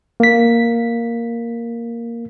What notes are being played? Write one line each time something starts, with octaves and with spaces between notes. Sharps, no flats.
A#3 B6